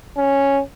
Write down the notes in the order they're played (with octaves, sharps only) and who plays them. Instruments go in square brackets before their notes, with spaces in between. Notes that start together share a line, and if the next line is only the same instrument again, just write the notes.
[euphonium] C#4